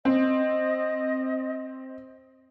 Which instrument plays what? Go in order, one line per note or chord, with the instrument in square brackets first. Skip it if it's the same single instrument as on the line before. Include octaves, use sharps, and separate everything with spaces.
[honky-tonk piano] C4 [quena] D#5